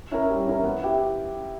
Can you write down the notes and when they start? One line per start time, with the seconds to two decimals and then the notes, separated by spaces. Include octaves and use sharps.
0.11 C#4 E4 A#4
0.30 G3
0.47 C#4 E4 A#4
0.64 B3
0.82 E4 G4